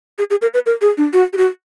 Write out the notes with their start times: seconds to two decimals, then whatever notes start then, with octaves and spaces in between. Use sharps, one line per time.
0.18 G#4
0.30 G#4
0.42 A#4
0.54 B4
0.66 A#4
0.82 G#4
0.98 D4
1.13 F#4
1.33 G4
1.37 F#4